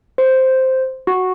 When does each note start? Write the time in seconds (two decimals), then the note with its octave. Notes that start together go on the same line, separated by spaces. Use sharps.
0.18 C5
1.07 F#4